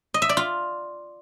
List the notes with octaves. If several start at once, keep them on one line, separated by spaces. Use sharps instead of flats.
D#5
E5
D5
F4